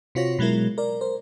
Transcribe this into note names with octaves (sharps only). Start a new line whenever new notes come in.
C3 C4 F4 F#4 C#5 A#6
B2 F#3 G#3 E4 A#4
A#4 D5
A#4 C5